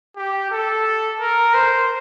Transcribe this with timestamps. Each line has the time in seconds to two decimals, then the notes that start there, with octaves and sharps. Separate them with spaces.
0.16 G4
0.51 A4
1.20 A#4
1.54 C5